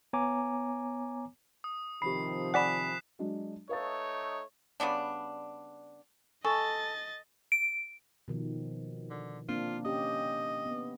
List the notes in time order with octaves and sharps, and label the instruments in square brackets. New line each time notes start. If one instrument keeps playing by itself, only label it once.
[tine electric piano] B3 C#5 G#5 A#5 D6
[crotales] D#6
[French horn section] C3 D#3 F3 [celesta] G4 B5 [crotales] C7
[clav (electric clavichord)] D5 F#5 [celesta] G#5 B5 [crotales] F#6 B6 E7
[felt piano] F#3 G#3 D4
[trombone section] A3 D#4 [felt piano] B4 F5 A6 [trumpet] C#5
[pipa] C#3 G3 B3 D4
[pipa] A4 [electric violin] D#5 A6 [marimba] G#5 A5 C#6
[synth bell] D7
[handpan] B2 D#3 F3
[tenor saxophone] D3
[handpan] A#3 C4 D4 [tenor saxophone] F4
[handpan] C#4 G4 [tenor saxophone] D#5
[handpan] B3